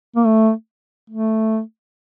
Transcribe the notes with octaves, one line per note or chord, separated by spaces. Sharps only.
A#3
A3
A3